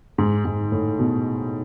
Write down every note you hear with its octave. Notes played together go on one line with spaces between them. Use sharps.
G#2
G#2
A2
B2